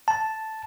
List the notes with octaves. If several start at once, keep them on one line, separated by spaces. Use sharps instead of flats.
A5